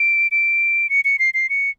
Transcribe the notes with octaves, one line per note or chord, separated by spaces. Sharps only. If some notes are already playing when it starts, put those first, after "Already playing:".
Already playing: D7
D7
C#7
C#7
C7
C7
C#7